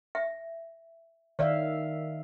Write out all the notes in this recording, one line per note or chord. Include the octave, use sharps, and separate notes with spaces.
E5
D#3 C#5 D5 E5 F5